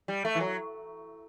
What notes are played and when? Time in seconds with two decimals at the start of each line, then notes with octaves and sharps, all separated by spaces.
0.08 G3
0.25 A3
0.35 E3
0.40 F#3